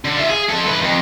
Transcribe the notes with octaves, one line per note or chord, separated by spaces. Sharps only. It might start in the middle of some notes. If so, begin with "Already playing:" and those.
D3
F4 E5
G#4
F3 A4
F#2 B4
F2